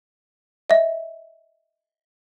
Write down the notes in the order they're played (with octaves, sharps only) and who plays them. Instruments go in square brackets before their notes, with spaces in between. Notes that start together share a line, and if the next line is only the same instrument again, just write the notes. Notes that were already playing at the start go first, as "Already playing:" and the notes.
[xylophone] D#5 E5